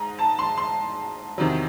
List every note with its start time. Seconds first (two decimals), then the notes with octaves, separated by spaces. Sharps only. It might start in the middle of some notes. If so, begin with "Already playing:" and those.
Already playing: G#2 A#5
0.19 A5
0.39 C6
0.58 C6
1.38 E2 C3 D#3 F#3